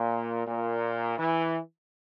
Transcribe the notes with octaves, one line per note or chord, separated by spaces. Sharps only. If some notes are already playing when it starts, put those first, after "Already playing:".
Already playing: A#2
A#2
E3